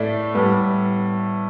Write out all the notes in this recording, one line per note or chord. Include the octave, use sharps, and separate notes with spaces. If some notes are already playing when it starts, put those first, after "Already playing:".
Already playing: A2 A3 D5 E5
A2 G3 B3